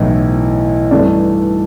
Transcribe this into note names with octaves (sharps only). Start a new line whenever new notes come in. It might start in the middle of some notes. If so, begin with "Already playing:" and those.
Already playing: B1 A2 E3
G2 E3 A3 D4